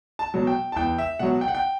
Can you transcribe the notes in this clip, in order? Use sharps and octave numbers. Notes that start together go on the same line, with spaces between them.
A5
B2 F#3
G5
A5
E2 G5
E5
B2 F#3 F#5
G5
F#5
G5